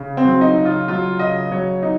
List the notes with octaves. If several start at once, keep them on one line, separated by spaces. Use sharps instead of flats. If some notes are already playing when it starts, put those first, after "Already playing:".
Already playing: C#3
C4
F#3
D#4
C#3
F4
F#3 F4
C#3 D#5
F#3 C#5
D#4